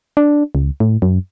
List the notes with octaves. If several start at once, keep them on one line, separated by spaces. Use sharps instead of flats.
D4
C#2
A2
F#2